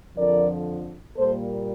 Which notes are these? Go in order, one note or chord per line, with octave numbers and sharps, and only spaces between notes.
F2 D3 F3 A#4 D5
A#2 G3 A#3 A4 C5